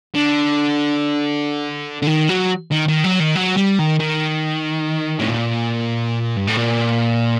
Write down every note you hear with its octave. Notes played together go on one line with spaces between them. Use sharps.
D3
D3
D#3
F#3
D#3
D#3
F#3
D#3
F#3
G3
D#3
D#3
A2
A#2
G2
A2
A#2